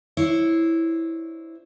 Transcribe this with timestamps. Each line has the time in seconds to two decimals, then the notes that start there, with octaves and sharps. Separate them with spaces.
0.17 D4 E4 C5 C#5